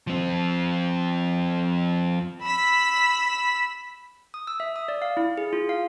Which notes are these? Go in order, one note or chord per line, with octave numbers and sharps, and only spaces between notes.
F3 C4
B5 E6 B6
D#6
E6
E5
D#6
D5
F5
E4
G#4
F4
F5